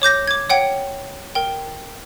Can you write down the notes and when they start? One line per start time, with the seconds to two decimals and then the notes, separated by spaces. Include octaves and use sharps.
0.02 C#5 D6 G6 A#6
0.28 D6 G#6
0.49 C#5 F#5 G5
1.35 A#4 G5